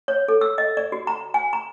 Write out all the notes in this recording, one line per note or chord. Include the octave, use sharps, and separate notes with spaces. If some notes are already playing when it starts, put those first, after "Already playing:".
C#5
A4
E6
D#5
D5
F#4
A#5
G#5
A#5